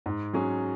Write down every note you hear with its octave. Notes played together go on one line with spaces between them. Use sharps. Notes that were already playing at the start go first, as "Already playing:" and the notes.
G#2
F#3 C#4 G#4